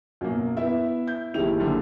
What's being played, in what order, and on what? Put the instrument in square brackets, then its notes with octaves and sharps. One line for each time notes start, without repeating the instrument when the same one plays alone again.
[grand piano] F#2 B2 A#3 [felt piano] F#4
[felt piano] B3 E5 [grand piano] E4
[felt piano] G6
[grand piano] F#1 D#3 F7 [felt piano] E4 G4 G#4
[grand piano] F#1 D3 G3